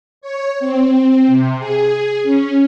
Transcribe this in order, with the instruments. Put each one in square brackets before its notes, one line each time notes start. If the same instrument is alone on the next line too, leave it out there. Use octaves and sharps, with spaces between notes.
[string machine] C#5
C4
C3
G#4
C#4